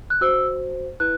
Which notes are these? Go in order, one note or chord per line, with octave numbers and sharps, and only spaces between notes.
F#6
F#4 C5 E6
E4 B4 F#6